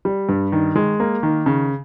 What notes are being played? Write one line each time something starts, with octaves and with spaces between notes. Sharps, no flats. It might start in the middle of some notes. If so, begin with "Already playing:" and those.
G3
G2
D#3
G#3
A#3
D#3
C#3